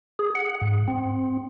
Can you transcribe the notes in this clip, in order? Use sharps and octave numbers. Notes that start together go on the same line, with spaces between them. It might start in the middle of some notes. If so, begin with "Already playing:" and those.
G#4
F#5
G#2
C4